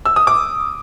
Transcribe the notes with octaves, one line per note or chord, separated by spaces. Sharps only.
E6
D#6
D6